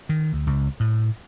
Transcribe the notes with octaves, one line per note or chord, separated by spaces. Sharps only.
D#3
D2
C#2
A2